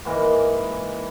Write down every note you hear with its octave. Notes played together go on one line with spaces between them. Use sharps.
G#2 E3 A#3 D#5